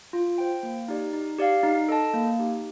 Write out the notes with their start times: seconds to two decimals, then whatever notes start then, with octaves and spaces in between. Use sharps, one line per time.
0.13 F4
0.38 C5 G5
0.63 A#3
0.88 D#4 G4 D5
1.13 D#4
1.39 G4 D5 F5
1.63 D#4
1.88 A4 D#5 A5
2.14 A#3
2.39 D#4 G4